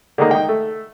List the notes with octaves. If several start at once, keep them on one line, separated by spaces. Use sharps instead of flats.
D3 D#3 G#3 A#3 D#4
D#4 G5
A3